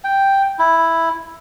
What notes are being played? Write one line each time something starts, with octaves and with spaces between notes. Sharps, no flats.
G5
E4